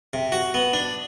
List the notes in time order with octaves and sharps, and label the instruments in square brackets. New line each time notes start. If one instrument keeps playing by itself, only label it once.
[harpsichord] C3
F#4
B3
D4